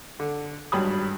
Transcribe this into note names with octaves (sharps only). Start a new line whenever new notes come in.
D3
G#1 G2 F#3 B5 D#6